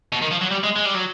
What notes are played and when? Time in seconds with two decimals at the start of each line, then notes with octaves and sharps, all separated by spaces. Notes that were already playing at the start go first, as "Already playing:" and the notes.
0.13 B2
0.22 D#3
0.32 F3
0.41 F#3
0.51 G3
0.64 G#3
0.76 G#3
0.86 G3
0.95 F#3